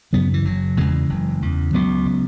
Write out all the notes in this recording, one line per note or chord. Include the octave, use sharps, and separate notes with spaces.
F#2 C#3 F#3 B3
E3
F#1 F#3
E2 C#3 E3 G#3
F#1
E2 C#3
C#2 F#3 B3
C#3